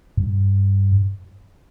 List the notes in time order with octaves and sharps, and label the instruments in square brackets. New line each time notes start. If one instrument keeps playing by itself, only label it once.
[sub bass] G2